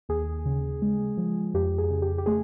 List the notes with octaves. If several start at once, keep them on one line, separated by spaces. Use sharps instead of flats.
D#2 G#4
C#3
G#3
F3
F2 G4
G#4
C#3
G4
G4
A3 G#4